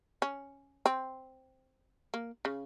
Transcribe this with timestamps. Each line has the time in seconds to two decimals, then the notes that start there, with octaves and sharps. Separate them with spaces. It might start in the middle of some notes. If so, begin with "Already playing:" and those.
0.22 C#4
0.86 C4
2.14 A#3
2.45 C#3